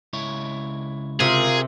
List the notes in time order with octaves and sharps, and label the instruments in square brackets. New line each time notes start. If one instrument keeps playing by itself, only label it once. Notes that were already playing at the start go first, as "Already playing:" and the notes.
[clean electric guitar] C#2 E4 C#5
[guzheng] C3 [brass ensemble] F4 A#4 [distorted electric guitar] G#4